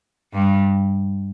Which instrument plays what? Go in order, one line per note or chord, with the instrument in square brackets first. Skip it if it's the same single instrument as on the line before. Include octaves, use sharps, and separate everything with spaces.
[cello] G2